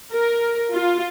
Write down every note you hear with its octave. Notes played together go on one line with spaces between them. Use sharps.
A#4
F4